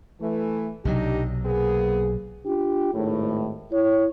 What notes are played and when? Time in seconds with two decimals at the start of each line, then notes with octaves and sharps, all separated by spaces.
0.21 E3 A3
0.85 B1 C3 F#3 D4 D#4 G4
1.46 A#3 B3 G#4
2.45 D4 F4 G4
2.94 G#1 A2
3.72 E4 C#5